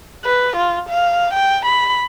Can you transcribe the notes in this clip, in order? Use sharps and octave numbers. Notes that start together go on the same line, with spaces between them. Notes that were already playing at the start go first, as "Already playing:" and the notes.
B4
F4
F5
G5
B5